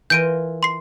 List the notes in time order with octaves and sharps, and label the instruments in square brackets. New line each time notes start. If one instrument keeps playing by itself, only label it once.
[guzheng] E3 F4 A#4 [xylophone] G6 D7 D#7
[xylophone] C6 C7